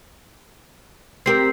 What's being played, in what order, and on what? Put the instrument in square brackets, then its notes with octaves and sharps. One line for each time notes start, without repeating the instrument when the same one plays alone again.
[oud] C4 G4 A#4 [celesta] C7